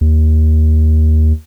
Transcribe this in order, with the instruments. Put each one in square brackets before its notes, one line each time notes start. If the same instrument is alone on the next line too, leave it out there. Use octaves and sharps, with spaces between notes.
[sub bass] D#2